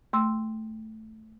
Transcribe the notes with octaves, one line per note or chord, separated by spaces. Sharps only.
A3 C6 E6